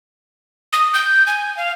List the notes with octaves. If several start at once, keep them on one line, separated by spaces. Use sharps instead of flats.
D#6
G6
G#5
F5